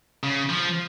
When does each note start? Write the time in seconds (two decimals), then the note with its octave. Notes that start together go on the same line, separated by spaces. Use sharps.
0.23 C#3
0.50 F3